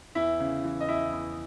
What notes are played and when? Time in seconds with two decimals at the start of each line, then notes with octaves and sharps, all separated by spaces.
0.15 E2 E4 E5
0.40 C#3
0.64 E3
0.81 D#5
0.89 E2 E4 E5
1.13 E2